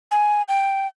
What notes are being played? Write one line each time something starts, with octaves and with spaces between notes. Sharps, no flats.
G#5
G5